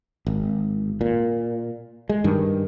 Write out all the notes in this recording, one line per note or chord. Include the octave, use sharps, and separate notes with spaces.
G#1
A#2
G#3
G2 D#3